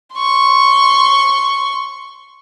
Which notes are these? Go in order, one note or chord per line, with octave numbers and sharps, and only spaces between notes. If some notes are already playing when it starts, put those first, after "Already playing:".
C6 C#6